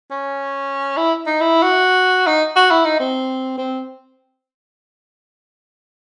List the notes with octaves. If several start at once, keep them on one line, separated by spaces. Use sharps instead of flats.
C#4
E4
D#4
E4
F#4
D#4
F#4
E4
D#4
C4
C4